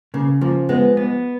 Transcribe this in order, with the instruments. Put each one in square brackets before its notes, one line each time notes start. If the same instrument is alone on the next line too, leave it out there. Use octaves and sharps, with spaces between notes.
[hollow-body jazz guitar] C#3 [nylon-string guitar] A#3
[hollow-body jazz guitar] F3 [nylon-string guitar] A#3
[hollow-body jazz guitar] G#3 [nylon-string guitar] B3
[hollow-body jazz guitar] B3